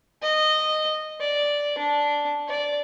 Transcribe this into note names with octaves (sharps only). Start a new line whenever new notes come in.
D#5
D5
D4
D5